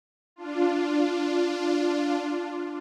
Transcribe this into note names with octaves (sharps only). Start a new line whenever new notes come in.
D4 F4